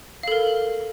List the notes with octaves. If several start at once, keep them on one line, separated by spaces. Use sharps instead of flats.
A4 A#4 F5